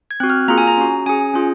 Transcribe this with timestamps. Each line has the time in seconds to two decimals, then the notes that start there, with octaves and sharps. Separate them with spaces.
0.11 G#6
0.20 C4 F#4 F#6
0.30 F6
0.48 A#3 F4 G#4 A#5
0.58 G#5
0.67 A#5
0.77 C#4 F#4
1.06 C#4 G#4 G#5
1.34 C#4 F4 G#4